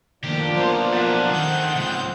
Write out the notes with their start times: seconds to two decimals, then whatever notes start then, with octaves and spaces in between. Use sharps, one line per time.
0.23 D#3 F3 A3 A#3 D4 G4
0.54 F#3 B3 C5
0.93 A3 G#4 F#5
1.30 D#3 C4 G6
1.76 C#2 F3